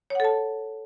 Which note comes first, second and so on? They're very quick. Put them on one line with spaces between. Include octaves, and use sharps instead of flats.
C#5 F#5 A4 A5